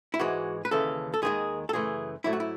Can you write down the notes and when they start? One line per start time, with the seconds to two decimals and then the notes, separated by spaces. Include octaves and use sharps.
0.14 E4
0.20 G#2 E3 G#3 F#4
0.65 B4
0.71 D#2 C#3 E3 A4
1.14 A4
1.22 D#2 D#3 G#3 G#4
1.69 A4
1.73 F#2 C#3 E3 A3 G#4
2.24 G#2 F#3 A3 E4
2.33 F#4
2.40 E4